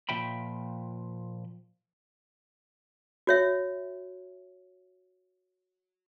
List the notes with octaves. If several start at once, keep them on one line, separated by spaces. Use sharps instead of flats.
A#2 F3 E5 G5 B5
F#4 C#5 E5